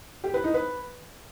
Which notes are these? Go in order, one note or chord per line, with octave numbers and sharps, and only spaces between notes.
G4
B4
D#4
B4